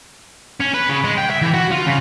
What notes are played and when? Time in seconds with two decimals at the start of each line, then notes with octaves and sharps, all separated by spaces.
0.60 C#4
0.74 B4
0.89 C#3
1.04 G#3
1.18 G5
1.30 E5
1.42 E3
1.54 F#4
1.71 F4
1.86 C#3